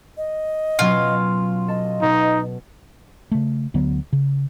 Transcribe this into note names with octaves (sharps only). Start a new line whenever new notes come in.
D#5
B2 F#3 C#4 F4
A4 D#5
B2 D#4
C#3 A3
D2 D3 F#3 B3
C#3